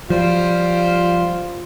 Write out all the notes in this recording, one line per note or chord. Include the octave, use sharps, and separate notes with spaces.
F3 G3 F4 C5 F5